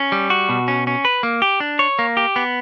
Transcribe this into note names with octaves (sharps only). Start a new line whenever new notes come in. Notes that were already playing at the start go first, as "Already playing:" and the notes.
Already playing: C#4
G3
F#4
B2
C#4
C#4
B4
A#3
G4
D4
C#5
A#3
G4
B3